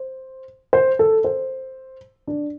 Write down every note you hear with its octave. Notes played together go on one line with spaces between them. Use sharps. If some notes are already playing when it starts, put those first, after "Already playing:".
Already playing: C5
C5
A4
C5
D4